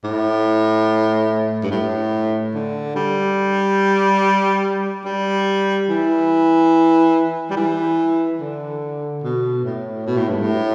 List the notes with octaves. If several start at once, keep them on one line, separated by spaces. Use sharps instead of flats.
A2
G2
A2
D3
G3
G3
E3
G3
E3
D3
B2
A2
B2
A2
G2
A2